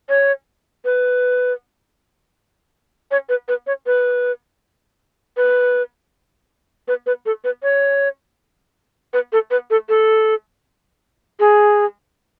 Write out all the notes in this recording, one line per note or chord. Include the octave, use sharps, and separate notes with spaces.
C#5
B4
C#5
B4
B4
C#5
B4
B4
B4
B4
A4
B4
C#5
B4
A4
B4
A4
A4
G#4